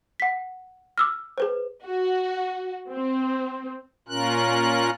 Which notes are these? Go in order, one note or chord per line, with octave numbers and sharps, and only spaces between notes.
F#5 B6
D6 E6 F6
G#4 B4 C5
F#4
C4
A#2 C#4 F4 A#4 F#6